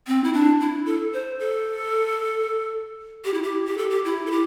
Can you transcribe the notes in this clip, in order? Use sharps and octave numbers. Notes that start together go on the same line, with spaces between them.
C4
E4
D4
E4
A4
C5
A4
G4
E4
G4
G4
A4
G4
E4
A4
G4